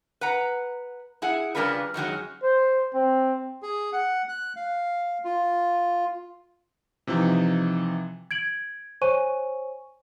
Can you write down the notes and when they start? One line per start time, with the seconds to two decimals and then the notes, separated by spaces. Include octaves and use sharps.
0.21 B4 F#5 A#5
1.22 E4 G#4 F#5
1.55 C#3 G3 D4 F4 A#4 B4
1.94 F#2 D#3 F#3 G#3
2.43 C5
2.94 C4
3.62 G#4
3.93 F#5
4.29 F#6
4.56 F5
5.24 F4
7.07 C3 E3 F3 D#4
8.31 G#6 D7 F#7
9.01 C5 C#5 G#5 C#6 D#7